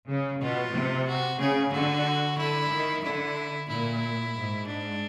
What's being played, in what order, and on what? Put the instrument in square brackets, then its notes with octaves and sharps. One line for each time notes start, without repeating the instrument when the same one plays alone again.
[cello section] C#3
[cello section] B2 [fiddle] F4
[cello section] C3
[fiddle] F#4
[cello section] C#3 [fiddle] G#4
[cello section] D3 [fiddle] F#4
[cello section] D3 [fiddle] E4
[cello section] D#3
[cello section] D3 [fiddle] E4
[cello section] A#2 [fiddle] E4
[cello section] G#2
[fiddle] D4